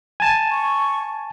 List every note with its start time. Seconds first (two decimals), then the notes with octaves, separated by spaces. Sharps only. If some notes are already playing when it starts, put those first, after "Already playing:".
0.20 G#5 A5
0.51 C#6